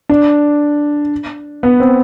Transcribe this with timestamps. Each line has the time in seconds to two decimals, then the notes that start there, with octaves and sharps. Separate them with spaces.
0.09 D4
1.63 B3
1.80 C4